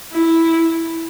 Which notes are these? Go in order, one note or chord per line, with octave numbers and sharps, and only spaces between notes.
E4